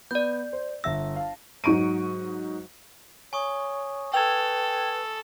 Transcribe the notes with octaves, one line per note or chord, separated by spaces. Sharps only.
B3 D5 G6
C5
G1 E5 E6 A#6
F5 A5
G#2 F#3 D#4 C#6 D7 D#7
C#5 G#5 C#6 D#6
A4 B4 G5 E6 G#6 F7